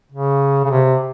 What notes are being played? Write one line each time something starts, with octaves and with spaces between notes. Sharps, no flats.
C#3
C#3
C3